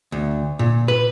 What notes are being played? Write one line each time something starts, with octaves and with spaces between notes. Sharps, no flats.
D2
A#2
B4